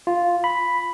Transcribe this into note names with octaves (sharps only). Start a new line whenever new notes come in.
F4
B5